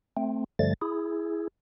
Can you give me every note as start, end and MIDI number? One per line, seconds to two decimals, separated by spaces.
0.17 0.44 57
0.17 0.44 60
0.59 0.74 43
0.59 0.74 50
0.59 0.74 53
0.59 0.74 55
0.59 0.74 57
0.59 0.74 93
0.82 1.48 64
0.82 1.48 68